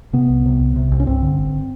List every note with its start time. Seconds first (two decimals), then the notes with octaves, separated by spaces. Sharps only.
0.13 C3 B3
0.29 C2
0.46 C3
0.60 C2
0.76 C3
0.92 C2
1.00 C#4
1.07 G2 C4
1.22 D3
1.38 G1